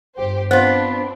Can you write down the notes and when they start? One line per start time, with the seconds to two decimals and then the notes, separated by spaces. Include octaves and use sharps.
0.17 G1 G4 C5
0.51 B3 C4 D4 F4 C5